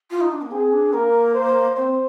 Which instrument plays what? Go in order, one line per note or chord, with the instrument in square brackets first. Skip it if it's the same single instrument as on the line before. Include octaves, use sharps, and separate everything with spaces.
[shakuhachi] F4
D#4
D4
A#3
[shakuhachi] C4 [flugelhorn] G#4
[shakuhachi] D4
[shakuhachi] A#3 [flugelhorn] A#4
[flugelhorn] C5
[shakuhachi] C4 [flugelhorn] C5